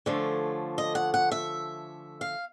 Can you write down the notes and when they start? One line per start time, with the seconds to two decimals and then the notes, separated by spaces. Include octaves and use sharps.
0.06 D3 F3 A3 C#4
0.78 D#5
0.95 F#5
1.14 F#5
1.31 E5
2.21 F5